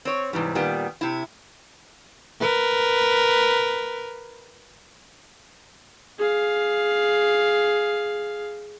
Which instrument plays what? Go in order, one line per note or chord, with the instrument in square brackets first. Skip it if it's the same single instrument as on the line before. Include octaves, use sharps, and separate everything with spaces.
[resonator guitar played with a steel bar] C4 C#5
G#2 C3 E3 G3
A#2 D#3 G3 B3
C3 E4
[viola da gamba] A#4 B4
[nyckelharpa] G#4 F5